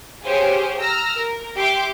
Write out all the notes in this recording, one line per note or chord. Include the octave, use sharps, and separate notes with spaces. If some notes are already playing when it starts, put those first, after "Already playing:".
G4 G#4 C5 C#5 F5
A#5 E6 F6 A#6
A#4
G4 E5 G5 C6 D6